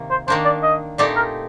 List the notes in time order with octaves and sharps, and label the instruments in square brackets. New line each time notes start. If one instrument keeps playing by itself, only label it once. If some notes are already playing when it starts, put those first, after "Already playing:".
Already playing: [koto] C3 D#3 A#3
[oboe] C5
[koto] D#3 A#3 D4 [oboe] C5
[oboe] D5
D#5
[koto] A#2 A3 C4 D#4 G4 [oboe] D5
[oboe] A#4